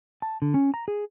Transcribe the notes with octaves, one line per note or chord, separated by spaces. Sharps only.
A5
D3
C#4
A#5
G#4